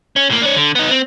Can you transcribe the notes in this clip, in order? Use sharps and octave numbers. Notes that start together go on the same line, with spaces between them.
C#4
A2 A#3
D4 C#5
D3
B3 D#4
C4